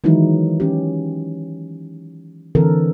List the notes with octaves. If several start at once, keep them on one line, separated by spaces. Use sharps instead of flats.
D#3 E3 F#3 G#3 D#4 E4
C#4 G4
D3 E3 C4 A4 A#4